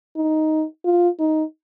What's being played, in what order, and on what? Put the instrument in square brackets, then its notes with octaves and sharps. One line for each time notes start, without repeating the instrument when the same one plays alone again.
[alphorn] D#4
F4
D#4